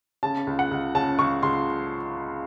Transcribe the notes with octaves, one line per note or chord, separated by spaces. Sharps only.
C#3 A5
C#2
F#5
C#2
C#3 A5
C#2 C#6
C#2 C6